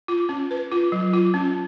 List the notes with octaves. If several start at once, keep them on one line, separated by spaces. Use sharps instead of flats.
F4
C#4
B4
F4
F#3
F4
C#4